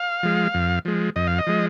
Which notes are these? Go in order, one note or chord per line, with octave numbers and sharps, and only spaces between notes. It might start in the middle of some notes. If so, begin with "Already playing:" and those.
Already playing: F5
F3 G#3
F2
F3 G#3
F2 D#5
F5
D#5
F3 G#3